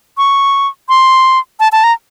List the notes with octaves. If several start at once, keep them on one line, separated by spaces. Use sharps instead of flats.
C#6
C6
A5
A5
A#5